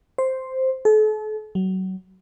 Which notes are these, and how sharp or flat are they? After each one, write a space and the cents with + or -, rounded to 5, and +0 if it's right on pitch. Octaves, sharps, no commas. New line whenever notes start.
C5 +0
A4 -40
F#3 +25